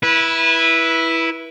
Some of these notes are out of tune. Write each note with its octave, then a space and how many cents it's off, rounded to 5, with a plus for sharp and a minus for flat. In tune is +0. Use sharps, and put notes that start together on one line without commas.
E4 +0 B4 -20